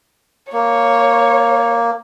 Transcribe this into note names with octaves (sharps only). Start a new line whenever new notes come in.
A#3 C#5